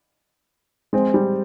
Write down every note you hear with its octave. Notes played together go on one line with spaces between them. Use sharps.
G#3 C4
G3